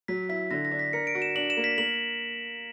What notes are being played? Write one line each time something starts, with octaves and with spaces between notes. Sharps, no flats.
F#3 B6
E4 B6
D3 A#6
A#6
D4
B6
A#4 C#7
D7
F#4
E7
D4 F#7
E7
A#3
B6
A#3 F#7